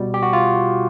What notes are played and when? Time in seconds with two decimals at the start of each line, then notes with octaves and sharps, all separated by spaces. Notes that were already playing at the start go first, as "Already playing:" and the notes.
Already playing: B2 G3
0.14 G4
0.23 F#4
0.33 F4